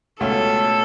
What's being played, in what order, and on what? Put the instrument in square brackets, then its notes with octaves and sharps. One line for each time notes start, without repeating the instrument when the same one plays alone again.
[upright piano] C#2 B2 A3 C#4 [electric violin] A4